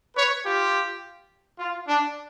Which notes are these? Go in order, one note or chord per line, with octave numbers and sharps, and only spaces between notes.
B4 C#5
F4 G4
F4
D4